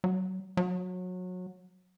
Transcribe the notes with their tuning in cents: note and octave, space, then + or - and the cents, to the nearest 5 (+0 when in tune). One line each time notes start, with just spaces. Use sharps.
F#3 +20
F#3 -25